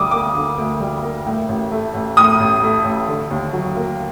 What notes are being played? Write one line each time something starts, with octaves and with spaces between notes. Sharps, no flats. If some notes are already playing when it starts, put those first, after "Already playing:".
Already playing: D2 D3 G3 D6 D#6
A#3 D6
D3
D2
G3
A#3
A2
A1
A3
A1
A2 D#6
A1
A3
A1
D3
D#2
F#3
A#3